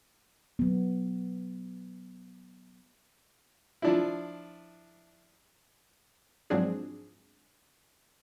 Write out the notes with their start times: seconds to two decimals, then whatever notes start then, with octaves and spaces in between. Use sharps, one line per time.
0.59 F#3 B3
3.82 F3 D4 E4
6.50 G#2 F3 F#3 C4 D4 G#4